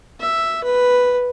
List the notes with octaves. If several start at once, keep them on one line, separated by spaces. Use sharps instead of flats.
E5
B4